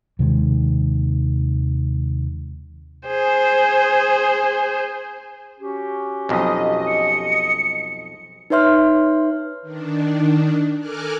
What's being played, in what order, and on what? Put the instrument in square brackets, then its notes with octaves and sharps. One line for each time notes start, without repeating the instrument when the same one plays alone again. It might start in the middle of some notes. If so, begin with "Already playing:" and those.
[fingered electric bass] D#2 C3 D#3 G#3
[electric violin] G#4 C5
[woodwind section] C#4 F#4 G4
[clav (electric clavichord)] B1 F2 [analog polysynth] D#5
[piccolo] C#7
[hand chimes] D#4 B4 C#5 E5 C6 F6
[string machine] D#3 D4
A4 A#4 G#5 D6 F6 F#6